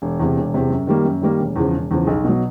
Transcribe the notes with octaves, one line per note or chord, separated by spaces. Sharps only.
E1
E2 C3
E1
E2 C3
F#2
D#3 G3 A#3
F#2
D#3 G3 A#3
E1
E2 C#3 F3
E1
E2 C#3 F3
B1
B2 F#3